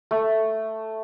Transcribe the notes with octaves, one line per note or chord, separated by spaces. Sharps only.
A3